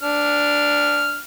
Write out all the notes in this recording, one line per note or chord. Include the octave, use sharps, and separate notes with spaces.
D4 F6